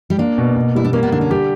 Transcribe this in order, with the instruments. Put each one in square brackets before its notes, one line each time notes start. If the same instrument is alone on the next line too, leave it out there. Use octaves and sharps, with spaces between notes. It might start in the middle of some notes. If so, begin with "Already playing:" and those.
[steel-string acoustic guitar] G3
[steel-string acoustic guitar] A#3 [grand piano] D4
[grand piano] B2
B2
[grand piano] G3 [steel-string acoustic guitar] E4
[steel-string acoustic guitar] D4
[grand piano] A#3 [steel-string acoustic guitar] C#4
[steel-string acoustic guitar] B3
[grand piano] D3 [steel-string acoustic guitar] D4
[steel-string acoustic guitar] C#4
[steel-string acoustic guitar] G3 [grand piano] G4